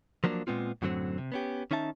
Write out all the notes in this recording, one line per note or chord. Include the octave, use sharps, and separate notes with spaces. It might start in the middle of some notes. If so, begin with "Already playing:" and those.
F3 F#3 A#3 D4
A#2 G#3 B3 C4 F4
F#2 A2 D3 F#3 C4
C3
B3 C#4 G4
D#3 C#4 D#4 E5 A5